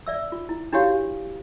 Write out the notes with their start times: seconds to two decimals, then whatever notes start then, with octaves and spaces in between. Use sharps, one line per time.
0.07 D5 E5 E6
0.32 F4
0.49 E4
0.73 D4 E4 F#4 G4 C#5 F5